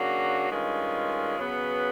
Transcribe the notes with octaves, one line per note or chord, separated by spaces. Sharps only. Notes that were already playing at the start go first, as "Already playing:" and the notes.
Already playing: C#3 F#3 A#3 D4 F#4
G2 D#3 G#3 C#4 F4
C#3 F#3 B3